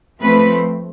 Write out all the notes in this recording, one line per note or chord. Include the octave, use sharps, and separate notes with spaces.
F3 A3 C4 B4